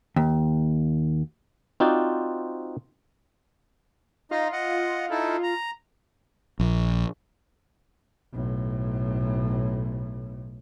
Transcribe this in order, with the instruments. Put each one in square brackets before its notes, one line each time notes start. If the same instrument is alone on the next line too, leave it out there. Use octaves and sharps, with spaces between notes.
[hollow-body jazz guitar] D#2
[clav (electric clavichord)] C4 D#4 F4 F#4 C5 D5
[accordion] D#4 D#5 [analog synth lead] F4
[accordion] D#5 F#5
D#4 E4 A4
A#5
[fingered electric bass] A#1
[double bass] B1 A2